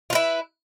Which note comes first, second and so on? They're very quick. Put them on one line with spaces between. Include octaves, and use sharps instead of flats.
F4 B4 E4